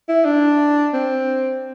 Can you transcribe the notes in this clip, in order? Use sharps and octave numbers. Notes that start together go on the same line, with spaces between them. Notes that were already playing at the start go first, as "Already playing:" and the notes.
E4
D4
C4